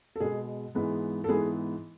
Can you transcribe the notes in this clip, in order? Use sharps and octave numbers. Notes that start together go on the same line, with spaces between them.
A4
B2 G#3 B3 G#4
G#2 E3 G#3 B3
A4
G#2 E3 B3 G#4